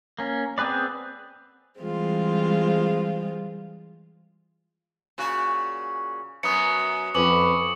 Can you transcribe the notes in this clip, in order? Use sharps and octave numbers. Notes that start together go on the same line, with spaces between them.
A#3 C#4
B3 C4 G#4 B4 D5
E3 G3 G#3 C4 F4
A#2 C#3 F#4
F#2 F#3 B3 D#6 C#7
F2 C#4 B4 D6 F#7